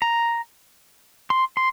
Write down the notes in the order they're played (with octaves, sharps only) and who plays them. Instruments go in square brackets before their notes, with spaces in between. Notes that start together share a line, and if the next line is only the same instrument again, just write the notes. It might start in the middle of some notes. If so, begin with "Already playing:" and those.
[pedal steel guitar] A#5
C6
C6